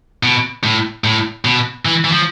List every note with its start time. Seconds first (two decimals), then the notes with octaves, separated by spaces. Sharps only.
0.23 B2
0.64 A2
1.04 A2
1.45 B2
1.85 E3
2.04 E3
2.12 F3